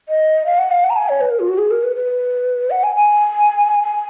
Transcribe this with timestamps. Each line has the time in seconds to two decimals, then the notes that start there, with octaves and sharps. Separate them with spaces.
0.09 D#5
0.46 F5
0.59 F#5
0.71 F5
0.84 F#5
0.90 A#5
0.96 G#5
1.09 C#5
1.21 B4
1.31 A#4
1.40 F4
1.49 F#4
1.58 G#4
1.71 A#4
1.83 B4
1.96 B4
2.71 F#5
2.83 G#5
2.96 G#5
3.83 G#5